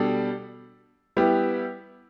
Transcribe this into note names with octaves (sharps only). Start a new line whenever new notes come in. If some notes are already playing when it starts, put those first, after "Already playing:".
Already playing: B2 G3 D4 A4
G3 B3 E4 G4